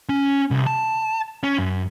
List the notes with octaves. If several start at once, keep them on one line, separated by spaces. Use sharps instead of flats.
C#4
C2
A5
C#4
F#2